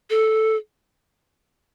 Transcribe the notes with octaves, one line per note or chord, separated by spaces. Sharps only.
A4